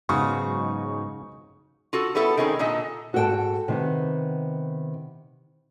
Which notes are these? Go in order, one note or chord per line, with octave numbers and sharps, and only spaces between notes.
G#2 C#3 F#3 G#3 B3 D#4 F#4 C#6
F4 F#4 A4
G3 B3 E4 A4
D#3 G#3 C4 C#4 D#4
A#2 D3 A4 D#5
G#2 F#4 A4 C5 G5 A5
C3 D#3 B3